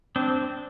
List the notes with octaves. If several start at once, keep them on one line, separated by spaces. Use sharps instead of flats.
C4 D4